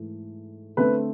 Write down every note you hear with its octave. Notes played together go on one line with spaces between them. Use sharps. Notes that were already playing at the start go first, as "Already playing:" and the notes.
Already playing: G#2 E3 A3
D3 A3 C4 B4